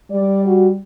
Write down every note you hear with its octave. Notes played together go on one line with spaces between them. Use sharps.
G3 D5
F#4